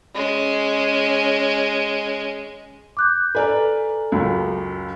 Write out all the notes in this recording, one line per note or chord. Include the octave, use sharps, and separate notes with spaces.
G#3 C#4
D6 F#6 G6
A4 B4 D5 G#5 A#5 F6
C#2 F#2